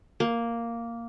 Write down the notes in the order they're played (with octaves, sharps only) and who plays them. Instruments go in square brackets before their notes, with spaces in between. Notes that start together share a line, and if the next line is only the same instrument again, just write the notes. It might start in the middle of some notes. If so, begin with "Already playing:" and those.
[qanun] A#3